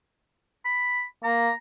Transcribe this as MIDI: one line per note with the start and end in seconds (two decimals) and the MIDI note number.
0.65 1.04 83
1.24 1.50 58
1.24 1.54 82